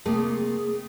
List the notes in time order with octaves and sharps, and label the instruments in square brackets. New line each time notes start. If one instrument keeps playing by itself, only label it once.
[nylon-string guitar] C3 A3 A#3 [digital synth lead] G#4